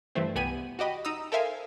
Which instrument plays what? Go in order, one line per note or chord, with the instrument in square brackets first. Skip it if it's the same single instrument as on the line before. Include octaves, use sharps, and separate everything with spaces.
[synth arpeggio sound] G2 E3 A3 C4
C2 B3 G4 G#5 B5 D#7
F#4 G4 D#5 B5
D#4 A#5 D#6 E6
A4 A#4 C5 E5 F5 G#5